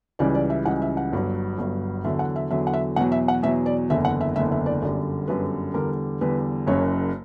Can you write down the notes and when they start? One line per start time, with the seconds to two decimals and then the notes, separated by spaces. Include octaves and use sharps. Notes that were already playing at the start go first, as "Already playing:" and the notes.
0.19 C#2 C#3 E3 G3 D5
0.35 D5
0.50 E5
0.65 C#2 C#3 E3 G3 F#5
0.82 E5
0.97 F#5
1.12 G1 G2 F#3
1.58 G1 G2 F#3
2.04 E2 D3 F#3 E5
2.19 F#5
2.36 E5
2.51 E2 D3 F#3 E5
2.67 F#5
2.73 E5
2.96 E2 B2 F#3 F#5
3.12 E5
3.28 F#5
3.43 E2 B2 F#3 E5
3.66 D5
3.90 F#1 E2 D3 E5
4.05 F#5
4.21 E5
4.36 F#1 E2 D3 E5
4.52 E5
4.66 D5
4.82 G1 F#2 D3 G3 D5
5.28 G1 F#2 D3 G3 B4
5.74 E2 D3 G3 A#4
6.21 E2 D3 G3 B4
6.67 F#1 F#2 C#3 F#3 C#5